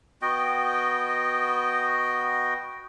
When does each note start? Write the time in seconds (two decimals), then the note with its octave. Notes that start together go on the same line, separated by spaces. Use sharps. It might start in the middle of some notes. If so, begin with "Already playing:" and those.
0.22 B3 F#4 D#5 G5